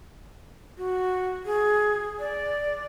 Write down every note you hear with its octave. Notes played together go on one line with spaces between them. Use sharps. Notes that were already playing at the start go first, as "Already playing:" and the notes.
F#4
G#4
D5